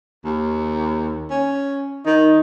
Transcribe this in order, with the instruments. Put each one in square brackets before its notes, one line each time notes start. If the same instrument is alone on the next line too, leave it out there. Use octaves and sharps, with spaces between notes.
[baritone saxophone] D#2
C#4
[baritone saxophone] D#3 [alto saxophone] D#4